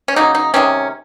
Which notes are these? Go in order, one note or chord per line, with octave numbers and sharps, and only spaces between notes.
C#4
C#3 F#3 A#3 D#4
D#4
C3 D#3 G#3 C#4